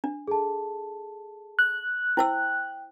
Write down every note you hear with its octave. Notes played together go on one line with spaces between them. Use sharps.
D4
G#4 A4 A5
F#6
E4 C5 G5 E6